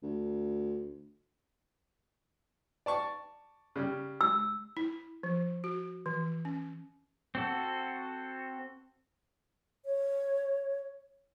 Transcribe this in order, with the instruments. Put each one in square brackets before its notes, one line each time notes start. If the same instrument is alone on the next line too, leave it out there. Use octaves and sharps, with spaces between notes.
[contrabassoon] D2
[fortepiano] D5 A5 C#6
C#3 G3
[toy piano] E6
[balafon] E4
F3
F#4
E3
C#4
[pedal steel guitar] C4 F#4 A4
[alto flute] C#5